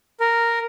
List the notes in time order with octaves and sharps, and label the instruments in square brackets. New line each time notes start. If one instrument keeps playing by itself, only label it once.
[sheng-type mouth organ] A#4